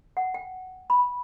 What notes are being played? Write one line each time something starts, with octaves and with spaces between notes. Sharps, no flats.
F#5
G5
B5